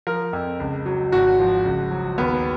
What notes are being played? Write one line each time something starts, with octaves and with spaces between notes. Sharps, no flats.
F3 A#4
F2
C#2
F#3
G#1 F#4
F3
C#2
F#3
D#2 B3